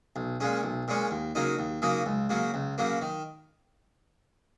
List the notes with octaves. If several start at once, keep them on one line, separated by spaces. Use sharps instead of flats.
B1
A#2 G#3 C#4
B1
A#2 G#3 C#4
D#2
C#3 F#3 A#3 D#4
D#2
C#3 F#3 A#3 D#4
C#2
C#3 F#3 A#3
C#2
C#3 F#3 A#3
D#3